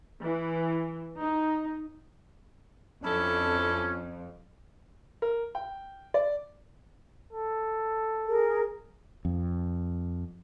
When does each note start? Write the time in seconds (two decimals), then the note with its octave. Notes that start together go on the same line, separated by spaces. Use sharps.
0.22 E3
1.20 D#4
3.04 F2 C#4 D4 E4 A4
5.22 A#4
5.55 G5
6.14 D5
7.33 A4
8.28 G#4 A#4
9.25 F2